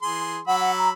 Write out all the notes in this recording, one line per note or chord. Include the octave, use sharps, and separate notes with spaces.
E3 G#4 C6
F#3 F#5 B5 E6
F#5
A#5